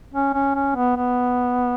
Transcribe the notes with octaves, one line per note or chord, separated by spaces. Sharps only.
C#4
C#4
C#4
B3
B3